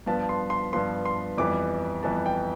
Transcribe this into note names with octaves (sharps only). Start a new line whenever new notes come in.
G2 F3 B3 A5
C6
C6
G2 F3 B3 C6
C6
F2 E3 G3 B3 D6
F2 E3 G3 B3 A5
G5